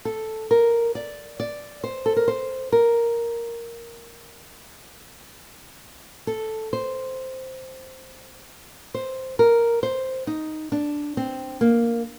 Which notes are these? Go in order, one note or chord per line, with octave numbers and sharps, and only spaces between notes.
A4
A#4
D5
D5
C5
A4
A#4
C5
A#4
A4
C5
C5
A#4
C5
D#4
D4
C4
A#3